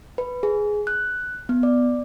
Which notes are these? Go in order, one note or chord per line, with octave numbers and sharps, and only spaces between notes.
B4
G#4
F#6
B3
D5